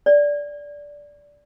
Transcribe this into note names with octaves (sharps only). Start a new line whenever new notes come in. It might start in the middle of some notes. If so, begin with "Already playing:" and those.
D5